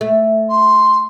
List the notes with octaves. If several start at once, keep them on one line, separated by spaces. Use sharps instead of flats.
A3
C6